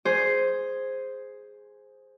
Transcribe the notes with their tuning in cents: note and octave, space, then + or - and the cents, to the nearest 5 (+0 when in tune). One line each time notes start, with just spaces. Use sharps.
G#4 +0 C5 +0